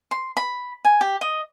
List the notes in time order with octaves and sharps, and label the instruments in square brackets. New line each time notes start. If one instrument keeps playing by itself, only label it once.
[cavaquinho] C6
B5
G#5
G4
D#5